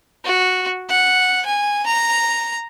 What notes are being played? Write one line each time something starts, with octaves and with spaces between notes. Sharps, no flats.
F#4
F#5
G#5
A#5